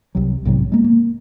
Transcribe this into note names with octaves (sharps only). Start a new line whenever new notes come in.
C2 C3 F#3
B1 G#2 C3 F#3
G#3 A#3
A#3